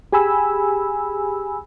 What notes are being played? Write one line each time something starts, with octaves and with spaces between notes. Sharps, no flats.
G4 G#4 G#5 B5 E6